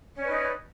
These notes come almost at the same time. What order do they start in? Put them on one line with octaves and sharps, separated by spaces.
C#4 D5 B4 D#4